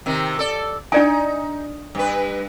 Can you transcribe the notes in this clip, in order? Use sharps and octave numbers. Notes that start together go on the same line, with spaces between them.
C3 D#3
A4 D5
D4 D#4 D5 G#5
G2 B4